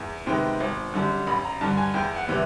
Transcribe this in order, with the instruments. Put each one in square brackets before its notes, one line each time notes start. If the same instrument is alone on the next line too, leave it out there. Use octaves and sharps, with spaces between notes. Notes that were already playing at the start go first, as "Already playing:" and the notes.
Already playing: [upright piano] E2
C3 D#3 G#3 B3 G5
G#1
F#2 D3 G3
A1 B5
A#5
G2 D3 A5
G#5
E2 G5
F#5
C3 E3 G3 B3